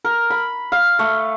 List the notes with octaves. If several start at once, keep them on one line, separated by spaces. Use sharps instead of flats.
A#4
B5
F5
A3